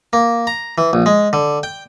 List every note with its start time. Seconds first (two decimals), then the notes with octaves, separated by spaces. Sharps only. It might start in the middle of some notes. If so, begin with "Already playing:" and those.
0.13 A#3
0.47 A#5
0.78 E3
0.93 A#1
1.06 G#3
1.33 D3
1.63 G5